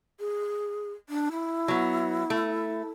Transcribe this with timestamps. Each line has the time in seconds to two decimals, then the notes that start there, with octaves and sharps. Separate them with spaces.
0.20 G#4
1.09 D4
1.31 E4
1.68 F#3 B3
2.30 A3